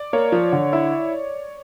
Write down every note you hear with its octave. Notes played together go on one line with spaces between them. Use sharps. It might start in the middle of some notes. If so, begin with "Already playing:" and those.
Already playing: D5
A#3 C#5
F3
D3
E4